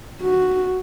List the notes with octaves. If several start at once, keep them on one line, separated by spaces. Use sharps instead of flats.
F#4